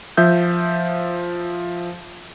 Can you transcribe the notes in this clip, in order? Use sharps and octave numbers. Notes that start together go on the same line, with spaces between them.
F3 E5 G6